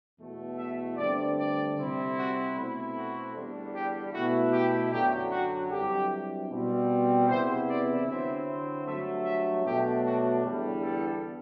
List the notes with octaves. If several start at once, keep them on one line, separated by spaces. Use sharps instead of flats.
E2 B2 A3
E5
G2 D3 A3 C4 D5
D5
C3 G3 C4 E4
F#4
B2 A3 C4 E4
F#4
E2 D3 G3 D4
G4
B2 A3 E4 F#4
G4
F#2 D3 F#3 G4
F#4
G2 F#3 C4 E4 G4
B2 G3 C4
E2 C3 E3 B3 E4 C5
D5
D3 F#3 C4 E4 E5
G2 F#3 A3 E5
E5
B2 F#3 A3 D4 G4
F#4
E2 D3 G3
A4